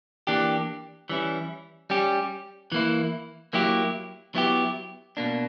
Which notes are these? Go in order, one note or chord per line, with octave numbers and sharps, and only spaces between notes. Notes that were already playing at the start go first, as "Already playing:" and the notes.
E3 A#3 D4 G4
E3 G3 C#4 E4
G3 C#4 G4
E3 A#3 E4
F#3 A#3 E4 G4
F#3 B3 E4 G4
B2 A#3 D4